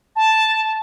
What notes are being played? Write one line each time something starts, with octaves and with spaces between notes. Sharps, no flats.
A5